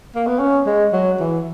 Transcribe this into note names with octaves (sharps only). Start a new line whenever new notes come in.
A#3
B3
C#4
G#3
F#3
E3